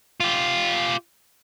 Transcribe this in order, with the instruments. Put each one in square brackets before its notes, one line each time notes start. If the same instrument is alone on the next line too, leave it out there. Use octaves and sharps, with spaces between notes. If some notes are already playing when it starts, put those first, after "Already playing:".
[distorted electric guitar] F4 G4